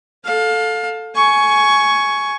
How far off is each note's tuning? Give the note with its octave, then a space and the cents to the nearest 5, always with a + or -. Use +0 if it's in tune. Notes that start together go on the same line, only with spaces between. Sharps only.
A4 +0 F5 +25
G#5 +15 C#6 +5